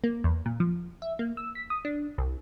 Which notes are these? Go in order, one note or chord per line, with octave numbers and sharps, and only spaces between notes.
A#3
E2
A#2
F3
E5
A#3
E6
B6
D#6
D4
C2